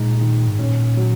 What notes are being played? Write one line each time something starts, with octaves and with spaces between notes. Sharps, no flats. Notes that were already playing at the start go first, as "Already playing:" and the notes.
Already playing: A#2 G#3 D#4
D#3
G#2
A#2 C#4
F#3